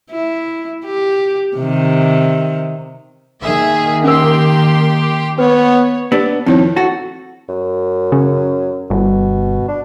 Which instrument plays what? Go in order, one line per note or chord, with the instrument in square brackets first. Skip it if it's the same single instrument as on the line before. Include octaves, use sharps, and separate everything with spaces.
[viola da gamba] E4
G4
C3 D#3
[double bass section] D#3 A#3 [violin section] G#4 E5
[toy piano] C#4 A#4 [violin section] G4 C6
[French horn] B3 [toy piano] B4 [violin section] C#5
[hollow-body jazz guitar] B3 D4 [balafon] G4
[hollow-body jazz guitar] F2 D#3 [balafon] C4 E4 C#5
[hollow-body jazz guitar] F#4 A4
[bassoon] F#2
[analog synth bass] C#3
[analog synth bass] G1 [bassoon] B2
[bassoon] D4